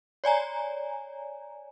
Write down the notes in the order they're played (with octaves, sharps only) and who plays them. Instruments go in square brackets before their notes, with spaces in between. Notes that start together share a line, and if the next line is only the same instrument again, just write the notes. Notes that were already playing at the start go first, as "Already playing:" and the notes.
[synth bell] C#5 D5 G#5 A#5